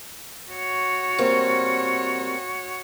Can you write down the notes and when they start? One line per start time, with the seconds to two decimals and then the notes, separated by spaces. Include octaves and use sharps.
0.51 F#4 C#5
1.18 G3 A#3 C4